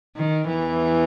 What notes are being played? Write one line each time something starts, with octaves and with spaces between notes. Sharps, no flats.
D#3
E2 E3